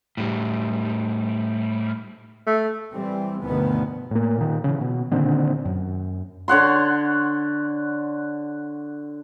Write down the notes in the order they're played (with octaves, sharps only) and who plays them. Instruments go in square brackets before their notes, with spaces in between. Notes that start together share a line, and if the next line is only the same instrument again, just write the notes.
[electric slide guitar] A2 G3
[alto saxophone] A3
[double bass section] E3 G3 C4
D2 G2 B2 D#3 F3 B3
[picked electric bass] A2 A#3
A#2 D#3
C#3 E3
B2
A#2 D3 D#3 C4
F#2
[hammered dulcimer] D3 C#5 F#5 C6